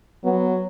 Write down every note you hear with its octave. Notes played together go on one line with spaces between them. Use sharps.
F#3 B3